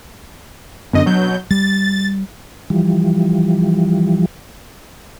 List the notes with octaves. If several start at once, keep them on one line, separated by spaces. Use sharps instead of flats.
F#2 D3 B3 C4 D4 D#5
B2 F#3 G6
G3 A6
E3 F3 G3